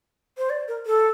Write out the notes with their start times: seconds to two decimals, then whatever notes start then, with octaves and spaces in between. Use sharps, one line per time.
0.38 C5
0.50 D5
0.68 A#4
0.86 A4